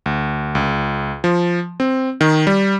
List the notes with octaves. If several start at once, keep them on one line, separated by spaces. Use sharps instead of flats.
D2
C#2
F3
C4
D#3
G3